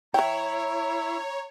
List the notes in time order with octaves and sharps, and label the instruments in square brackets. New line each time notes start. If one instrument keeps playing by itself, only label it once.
[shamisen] E3 G5 [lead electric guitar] E4 [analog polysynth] C#5 [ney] A#5